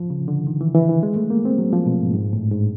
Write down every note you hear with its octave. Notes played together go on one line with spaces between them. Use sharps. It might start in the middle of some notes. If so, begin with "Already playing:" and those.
Already playing: F3
C#3
D3
D#3
E3
E3
E3
G#3
A3
A#3
C4
F#3
F3
B2
G#2
G#2
A2
G#2